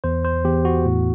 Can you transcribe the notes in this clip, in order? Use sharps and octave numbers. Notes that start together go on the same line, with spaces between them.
E2 C5
C5
E2 G4
F#4
A2